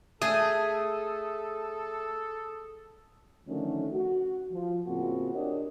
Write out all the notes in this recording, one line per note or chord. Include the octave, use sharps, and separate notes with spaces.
A3 G#4 A4 D#6
D3 D#3 F3 F#3 A3 C#4
F#4
F3
A2 C#3 A#3 C4 F4 F#4
D4 G4 A#4 C#5 D#5